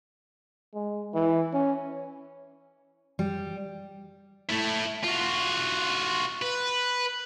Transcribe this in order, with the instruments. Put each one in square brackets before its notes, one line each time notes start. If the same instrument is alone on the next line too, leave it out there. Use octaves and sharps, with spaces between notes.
[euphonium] G#3
E3
C#4
[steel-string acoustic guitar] G3
[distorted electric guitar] A3 E4
F4 F#4
B4